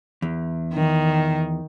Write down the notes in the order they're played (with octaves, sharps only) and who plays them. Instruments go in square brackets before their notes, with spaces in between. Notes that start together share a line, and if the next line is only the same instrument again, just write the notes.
[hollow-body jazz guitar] E2
[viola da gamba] D#3